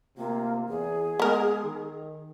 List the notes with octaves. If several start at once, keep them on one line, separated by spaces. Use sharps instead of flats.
D2 C3 A#3 F4
E2 G#4
G#3 B3 A#4
D#3